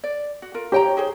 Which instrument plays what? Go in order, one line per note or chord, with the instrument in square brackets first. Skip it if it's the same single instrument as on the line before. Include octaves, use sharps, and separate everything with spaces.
[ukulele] D5
F#4
F4 A#4
[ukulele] D#4 G5 A#5 [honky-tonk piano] G4 C#5
[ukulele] D#4 G#4 C5